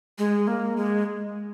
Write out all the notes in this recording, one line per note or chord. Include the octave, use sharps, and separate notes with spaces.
G#3
A#3
G#3